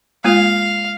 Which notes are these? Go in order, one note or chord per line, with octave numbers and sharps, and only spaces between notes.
G#3 A#3 F4 F5